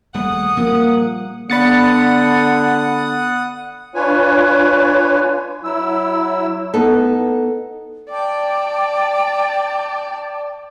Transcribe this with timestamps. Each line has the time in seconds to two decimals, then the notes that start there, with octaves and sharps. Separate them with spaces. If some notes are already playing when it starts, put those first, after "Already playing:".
0.14 D#1 G#2 G3 A3 G#4 F#5 D#6
0.57 A#2 F3 G3 A#3
1.50 D3 B3 D5 F#5 B5 D#6 A6 C#7
3.94 D4 F4 B4 C#5 G#5
5.64 F#3 E4 E6
6.74 B3 D#4 A4
8.10 D5 G5 A5 D6